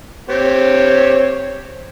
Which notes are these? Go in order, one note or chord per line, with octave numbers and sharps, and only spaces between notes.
C4 G4 C#5